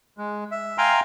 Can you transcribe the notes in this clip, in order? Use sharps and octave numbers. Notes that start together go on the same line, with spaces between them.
G#3
E5
F5 G5 G#5 A#5 C6 F6